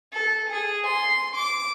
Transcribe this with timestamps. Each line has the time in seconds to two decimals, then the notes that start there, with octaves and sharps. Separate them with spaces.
0.13 A4
0.50 G#4
0.86 C6
1.36 D6